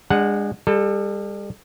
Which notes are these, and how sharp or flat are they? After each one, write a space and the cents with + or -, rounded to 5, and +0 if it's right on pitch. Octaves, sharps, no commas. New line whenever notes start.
G#3 -30 D4 +0 F#5 +0
G3 +35 A4 +0